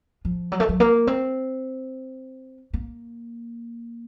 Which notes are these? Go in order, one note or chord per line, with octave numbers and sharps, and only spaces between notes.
F3
F#3
A3
F#3
A#3
C4
A#3